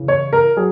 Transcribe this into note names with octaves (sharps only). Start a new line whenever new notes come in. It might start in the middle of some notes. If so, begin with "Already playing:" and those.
Already playing: C#3 E3
C#5
A#4
F#3 G#4